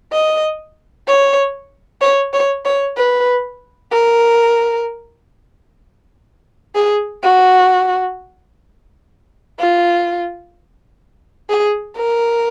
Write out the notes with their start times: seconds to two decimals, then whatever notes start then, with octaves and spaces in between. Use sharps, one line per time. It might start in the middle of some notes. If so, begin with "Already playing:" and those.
0.12 D#5
1.07 C#5
2.01 C#5
2.33 C#5
2.65 C#5
2.97 B4
3.91 A#4
6.75 G#4
7.23 F#4
9.60 F4
11.49 G#4
11.96 A#4